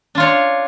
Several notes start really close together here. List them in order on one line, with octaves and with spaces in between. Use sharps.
D4 F4 C#5